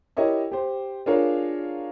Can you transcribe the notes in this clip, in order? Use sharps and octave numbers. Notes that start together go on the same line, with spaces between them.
E4 G4 A#4 C#5 D#5 E5
G4 C5
D4 F4 G#4 A#4 C#5 F5